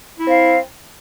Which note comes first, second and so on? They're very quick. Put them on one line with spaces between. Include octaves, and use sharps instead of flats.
E4 C4 F5